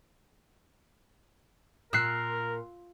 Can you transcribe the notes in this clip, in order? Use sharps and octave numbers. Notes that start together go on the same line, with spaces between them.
A#2 A#4 E6 F#6 C7